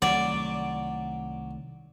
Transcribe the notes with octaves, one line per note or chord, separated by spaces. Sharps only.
C2 D#3 F#3 A3 D5